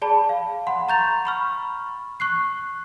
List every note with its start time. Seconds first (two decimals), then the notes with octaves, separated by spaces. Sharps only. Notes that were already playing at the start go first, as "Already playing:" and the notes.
0.02 G#4 D5 A5 B5
0.29 F5
0.67 F#5 B5 C6
0.89 A#5 C#6 G6 A6 F7
1.25 B5 C#6 F6
2.20 C#6 F#6 C7